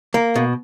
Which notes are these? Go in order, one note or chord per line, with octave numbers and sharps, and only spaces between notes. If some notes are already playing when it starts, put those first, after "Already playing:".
A#3
B2